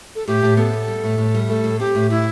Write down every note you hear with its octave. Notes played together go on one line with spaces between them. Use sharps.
A4
A2 G4
A2
B3 A4
B3
G3
A2
A2
G3
A3 A4
A2
C4 G4
A2
A2 E4